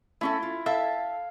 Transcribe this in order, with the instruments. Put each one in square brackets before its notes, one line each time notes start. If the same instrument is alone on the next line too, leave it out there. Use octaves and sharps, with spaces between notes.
[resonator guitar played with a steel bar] A3 C#4 A4 [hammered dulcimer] E4
[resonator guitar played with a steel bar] F4
[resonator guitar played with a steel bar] A4 E5 [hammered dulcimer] F5